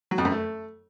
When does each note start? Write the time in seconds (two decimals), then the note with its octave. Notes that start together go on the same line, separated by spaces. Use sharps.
0.11 F#3
0.18 F2
0.25 F#2
0.32 A3